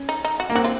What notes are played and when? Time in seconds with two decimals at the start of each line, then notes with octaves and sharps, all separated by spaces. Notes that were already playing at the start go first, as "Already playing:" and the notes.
Already playing: C#4
0.09 D#4
0.25 D#4
0.40 F#4
0.50 A#3
0.55 C4 F#4
0.64 F4